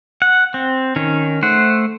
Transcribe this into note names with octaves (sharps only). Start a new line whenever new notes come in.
F#5
C4
D#3 C#4
A3 C5 F#5